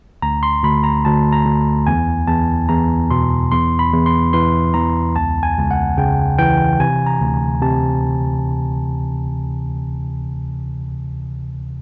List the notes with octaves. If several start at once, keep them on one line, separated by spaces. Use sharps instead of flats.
D2 A#5
C6
D2 B5
A#5
D2 A5
A#5
D2
E2 G#5
E2 A5
E2 A#5
B2 C6
E2 C6
B5
E2
C6
E3 C6
E2 A#5
C#2 A5
G#5
C#2
F#5
C#3 G5
E3 G5
C3 G#5
A#5
D2
C3 A5